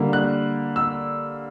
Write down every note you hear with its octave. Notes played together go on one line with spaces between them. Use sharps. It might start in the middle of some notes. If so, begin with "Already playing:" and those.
Already playing: D3 G3 A#3
F#6
E6